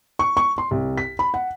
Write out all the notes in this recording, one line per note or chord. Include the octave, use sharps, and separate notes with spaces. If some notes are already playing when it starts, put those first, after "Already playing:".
C#6
C#6
C6
C2
B6
B5
F#5